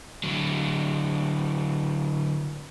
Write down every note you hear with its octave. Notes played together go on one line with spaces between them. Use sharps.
D3 F#3